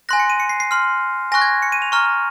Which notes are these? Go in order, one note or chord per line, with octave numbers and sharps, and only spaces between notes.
G#5 C6 F#6 A#6
C#7
D#7
C#7
C7
C7
C6 F6
G#5 C#6 F#6 A#6
G#6
C#7
D#7
F7
A#5 C#6 F6